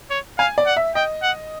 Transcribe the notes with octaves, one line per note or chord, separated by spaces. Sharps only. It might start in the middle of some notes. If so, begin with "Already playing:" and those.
C#5
F5 G#5
D5
F#5
E5
D#5 G5
F#5